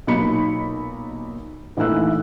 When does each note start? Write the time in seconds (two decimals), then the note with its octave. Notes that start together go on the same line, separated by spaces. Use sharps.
0.07 B1 A#2 F#3 D#4 B5 C#7
1.77 A#1 E3 A3 D#4 E6 F#6